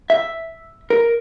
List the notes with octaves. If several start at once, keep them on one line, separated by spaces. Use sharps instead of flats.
E5
A#4